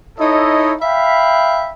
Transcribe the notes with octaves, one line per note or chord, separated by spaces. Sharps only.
D#4 E4 A4 C#5 D#5
E5 F5 G5 B5